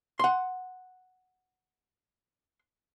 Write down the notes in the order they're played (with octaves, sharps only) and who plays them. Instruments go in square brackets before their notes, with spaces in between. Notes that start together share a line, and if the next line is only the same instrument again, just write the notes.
[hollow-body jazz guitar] F#5 C6